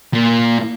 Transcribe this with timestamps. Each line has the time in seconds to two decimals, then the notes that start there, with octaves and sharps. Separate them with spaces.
0.14 A#2